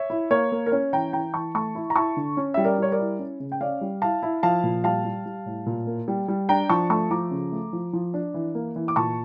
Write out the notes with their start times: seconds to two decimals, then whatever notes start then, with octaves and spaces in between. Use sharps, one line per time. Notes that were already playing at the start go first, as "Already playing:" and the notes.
Already playing: C#5 E5
0.10 E4
0.31 A#3 C#5
0.52 A#3
0.66 A#4
0.72 C#4 C#5
0.93 E3 G5 A#5
1.13 E3 G5 A#5
1.34 E3 A5 C#6
1.55 A3 A5 C#6
1.75 E4
1.90 A#5
1.96 E4 A5 C#6
2.17 D3
2.37 C#4
2.54 G3 E5
2.65 A#4 D5
2.78 G3 C#5
2.92 A#4 D5
2.99 E4
3.19 C#4
3.40 C#3
3.52 G5
3.61 C#4 D5 F5
3.81 G3
4.02 E4 F5 A5
4.23 E4
4.43 F3 F5 A5
4.64 A#2
4.84 G3 F5 A5
5.05 G3
5.26 G3
5.46 A2
5.66 A#2
5.87 A#3
6.08 G3
6.28 G3
6.49 D4 G5 A#5
6.69 F3 A5 C#6
6.90 A3 A5 C#6
7.11 F3 A#5 D6
7.31 C#3
7.52 A3
7.73 F3
7.93 F3
8.14 D4
8.34 E3
8.55 A#3
8.76 E3
8.88 D6
8.96 A#2 A5 C#6